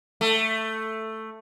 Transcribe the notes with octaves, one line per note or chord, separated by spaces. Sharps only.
A3